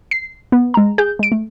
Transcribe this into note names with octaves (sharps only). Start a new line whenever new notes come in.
C7
B3
G#3 A#5
G#4 G6
G#3 D7
A3